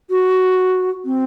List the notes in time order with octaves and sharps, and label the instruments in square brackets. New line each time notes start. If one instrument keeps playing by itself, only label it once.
[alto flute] F#4
C4